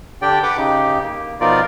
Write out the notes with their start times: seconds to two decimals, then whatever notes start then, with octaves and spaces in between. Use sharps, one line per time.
0.22 D3 D4 G4 D5 G5
0.43 B4 F#5 D6
0.57 C#3 D#4 G4
1.03 A#3
1.40 B2 F3 D#4 F4 A#4 D5